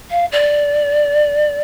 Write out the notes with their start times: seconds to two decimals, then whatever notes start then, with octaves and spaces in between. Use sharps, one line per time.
0.10 F5
0.32 D5